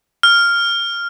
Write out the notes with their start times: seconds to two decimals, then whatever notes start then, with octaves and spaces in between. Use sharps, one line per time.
0.23 F6